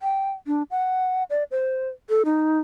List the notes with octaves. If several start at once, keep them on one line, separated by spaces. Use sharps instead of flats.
G5
D4
F#5
D5
C5
A4
D#4